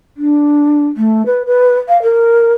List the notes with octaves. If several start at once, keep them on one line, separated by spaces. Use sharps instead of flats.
D4
A3
B4
B4
F5
A#4